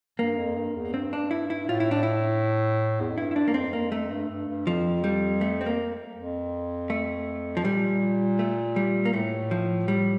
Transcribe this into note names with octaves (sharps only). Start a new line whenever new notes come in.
G2 A#3
F2
G2
E2
G2 C4
D4
E4
E4
A2 F4
E4
D4
E4
E2
F2
G2 E4
E4
D4
A#3
F2 C4
A#3
F2 A3
G2
G2
G2
F2 F3
G3
A3
C4
A#3
F2
A3
F3
A#2 G3
A3
G3
A#3
A2 A3
F3
G3